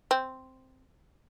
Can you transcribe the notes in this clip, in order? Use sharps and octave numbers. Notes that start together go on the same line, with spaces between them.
C4